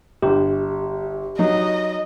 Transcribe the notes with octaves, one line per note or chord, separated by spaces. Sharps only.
G1 G4
F#3 D#4 D#5